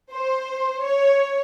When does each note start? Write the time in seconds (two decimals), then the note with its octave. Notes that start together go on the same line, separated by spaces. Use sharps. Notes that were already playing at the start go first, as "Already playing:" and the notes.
0.11 C5
0.83 C#5